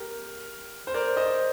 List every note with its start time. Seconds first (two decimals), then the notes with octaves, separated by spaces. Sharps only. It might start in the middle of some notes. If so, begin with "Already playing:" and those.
Already playing: G4 A#4
0.87 C5
0.94 A#4 D5
1.17 C5 D#5